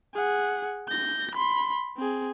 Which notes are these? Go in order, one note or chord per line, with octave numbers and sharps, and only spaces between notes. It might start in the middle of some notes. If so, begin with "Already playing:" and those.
G#4 F#5
G6 A#6
B5 C6
C4 G#4